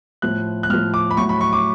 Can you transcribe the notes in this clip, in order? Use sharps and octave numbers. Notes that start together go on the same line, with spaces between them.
A2 F3 F#6
F#6
A2 F3 F6
D6
B5
A2 F#3 C#6
B5
C#6
D6